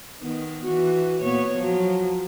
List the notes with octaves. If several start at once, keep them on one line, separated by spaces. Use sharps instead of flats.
D#3 B3
E3 F#4
A#2 B3 C#5
F3 F#3